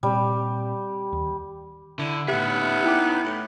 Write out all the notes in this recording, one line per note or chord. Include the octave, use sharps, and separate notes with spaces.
A#2 G3 C4
D#2
D3 E4
A2 B3 D#4 G4 E5
E4 G5 D6
A2